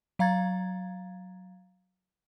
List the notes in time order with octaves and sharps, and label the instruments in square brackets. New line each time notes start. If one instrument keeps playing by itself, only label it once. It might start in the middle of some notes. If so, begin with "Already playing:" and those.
[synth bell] F#3 F5 A#5 G#6 A6